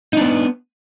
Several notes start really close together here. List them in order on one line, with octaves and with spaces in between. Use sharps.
D#4 D4 B3